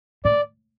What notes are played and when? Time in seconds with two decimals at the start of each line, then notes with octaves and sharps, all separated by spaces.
0.25 A2 D5